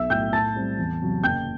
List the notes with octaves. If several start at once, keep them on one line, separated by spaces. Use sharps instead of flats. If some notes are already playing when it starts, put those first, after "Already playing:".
Already playing: B1 E5 E6
A2 F#3 G5 G6
A2 A5 A6
G3 C4
E2
C3 F#3
F#1 G5 G6